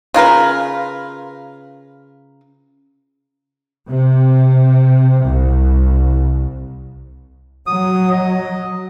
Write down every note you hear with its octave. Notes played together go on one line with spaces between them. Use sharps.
C#3 F4 A#4 B4
C3
C2
F#3 D#6
D#5